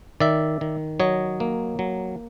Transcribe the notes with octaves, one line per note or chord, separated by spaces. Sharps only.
D#3 D5 E5
D#3
F#3 C#5 D#5
A#3
F#3